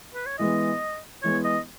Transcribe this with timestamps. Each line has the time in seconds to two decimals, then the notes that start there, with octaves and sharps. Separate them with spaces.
0.14 B4
0.26 C#5
0.38 E3 G#3 B3 D#5
1.23 E3 G#3 B3 C#5
1.44 D#5